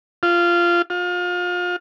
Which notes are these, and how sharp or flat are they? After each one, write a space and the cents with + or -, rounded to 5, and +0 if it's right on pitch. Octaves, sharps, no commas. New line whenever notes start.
F4 -15
F4 +30